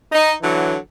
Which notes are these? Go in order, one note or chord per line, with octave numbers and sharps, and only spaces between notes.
D#4
D3 E3 F#3